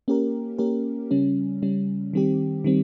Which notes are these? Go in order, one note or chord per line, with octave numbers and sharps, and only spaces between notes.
A#3 C#4 G4 A#4
A#3 C#4 G4 A#4
C#3 G3 C#4
C#3 G3 C#4
D#3 G3 C4 G4
D#3 G3 C4